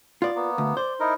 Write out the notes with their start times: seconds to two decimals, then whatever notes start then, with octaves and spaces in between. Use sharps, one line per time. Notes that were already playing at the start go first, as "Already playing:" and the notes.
0.22 B3 F4 D5
0.35 A#3 B3
0.58 D2
0.77 C5 D5
1.00 D#4 E4 A#4